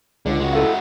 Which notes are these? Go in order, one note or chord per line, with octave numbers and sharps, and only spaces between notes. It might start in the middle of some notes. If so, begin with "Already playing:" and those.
C#2 D3
G#3 F#4
E4 A4 F5